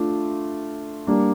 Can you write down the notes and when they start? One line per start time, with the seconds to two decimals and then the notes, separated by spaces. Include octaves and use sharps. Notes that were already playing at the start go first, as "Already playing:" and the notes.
Already playing: A3 D4 F4
1.07 G3 A#3 D4